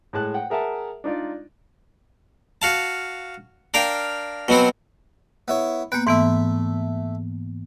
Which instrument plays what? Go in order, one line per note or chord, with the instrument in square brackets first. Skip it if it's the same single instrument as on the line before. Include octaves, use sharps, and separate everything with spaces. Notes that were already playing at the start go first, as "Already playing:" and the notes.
[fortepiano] A2 G#3 A5 F#6
F#5 G5
G#4 A#4 E5 F#5 A5
D4 D#4 F4 D5
[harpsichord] F#4 F5 A5
D4 A#4 F5 G5
B2 F#3 B3 C4
B3 E4 C#5
[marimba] A#3 B3 [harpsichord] B4 G5
[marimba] G#2 E3 B3 [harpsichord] A3 E5